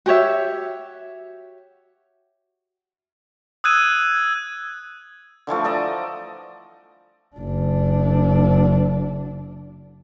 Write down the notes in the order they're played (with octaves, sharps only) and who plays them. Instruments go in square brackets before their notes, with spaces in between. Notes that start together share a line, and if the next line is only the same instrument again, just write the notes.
[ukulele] F#4 G4 C#5 E5
[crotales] D#6 E6 F#6 G#6 D#7
[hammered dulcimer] D3 E3 F3 A3
A4 D5 D#5 A#5
[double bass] F#1 D4